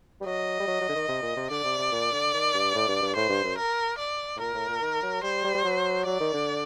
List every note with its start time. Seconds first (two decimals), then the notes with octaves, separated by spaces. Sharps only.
0.21 G3
0.26 F#3 D#5
0.60 G3
0.67 F#3
0.81 F#3
0.89 D3
0.95 D#3
1.09 C3
1.23 A#2
1.37 C3
1.50 D3 D5
1.65 C3
1.78 C3
1.92 A#2
2.12 D3
2.34 D#3
2.54 G2
2.75 A2
2.88 G2
3.02 G2
3.16 A2 C5
3.30 G2
3.44 F#2
3.58 A#4
3.98 D5
4.36 A2
4.40 A#2 A#4
4.54 A2
4.68 A#2
4.82 D#3
5.03 F#3
5.23 G3 C5
5.44 G3
5.55 G3
5.64 F#3
6.06 F#3 D5
6.20 D#3
6.34 D3